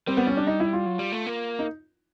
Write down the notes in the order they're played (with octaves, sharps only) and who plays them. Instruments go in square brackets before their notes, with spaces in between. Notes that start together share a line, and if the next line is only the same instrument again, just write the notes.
[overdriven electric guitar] G3 [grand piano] C4
[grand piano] B3
C#4
D4
D#4
E4
F4
[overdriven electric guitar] F#3
G3
A3
A#3
[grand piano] D#4